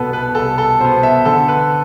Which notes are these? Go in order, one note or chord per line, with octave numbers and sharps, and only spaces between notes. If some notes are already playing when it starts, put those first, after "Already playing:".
Already playing: C2 B2 B3 A4 B4
B4
C2 A4
A4
B2 B3 C5
E5
D3 A4
B4